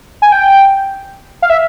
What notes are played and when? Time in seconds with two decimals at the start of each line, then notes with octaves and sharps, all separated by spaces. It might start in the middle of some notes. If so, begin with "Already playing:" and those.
0.22 G#5
0.32 G5
1.42 F5
1.50 E5